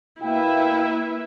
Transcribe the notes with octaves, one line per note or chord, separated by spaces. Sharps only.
B2 A#3 E4 B4 E5 F5 G5